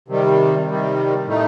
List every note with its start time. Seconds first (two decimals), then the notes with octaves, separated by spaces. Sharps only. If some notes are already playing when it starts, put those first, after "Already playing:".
0.08 C3 D#3 G3
0.67 C3 D#3 G3
1.26 A2 A3 D#4